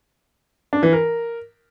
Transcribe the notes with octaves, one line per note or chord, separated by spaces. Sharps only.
D4
E3
A#4